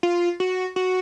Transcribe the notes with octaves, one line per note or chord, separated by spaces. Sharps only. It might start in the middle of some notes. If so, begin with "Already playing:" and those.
F4
F#4
F#4